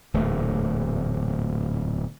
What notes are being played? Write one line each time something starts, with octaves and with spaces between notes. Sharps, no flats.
D1 E2 A#2 A3